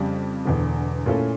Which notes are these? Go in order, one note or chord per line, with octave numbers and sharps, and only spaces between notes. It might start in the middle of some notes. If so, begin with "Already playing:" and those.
Already playing: F2 C#3 G3
E1 E2 D3
A#2 A3 C#4 E4 A4